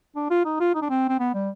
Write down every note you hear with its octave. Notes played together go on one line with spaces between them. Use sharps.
D4
F4
D#4
F4
D#4
D4
C4
C4
B3
G3